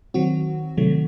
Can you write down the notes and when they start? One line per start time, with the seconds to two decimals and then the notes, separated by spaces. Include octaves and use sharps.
0.14 D#3 F#3 C4 F#4
0.77 C3 D#3 F#3 A3